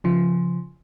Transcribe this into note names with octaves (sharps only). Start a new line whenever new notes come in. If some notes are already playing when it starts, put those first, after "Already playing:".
C#3 F3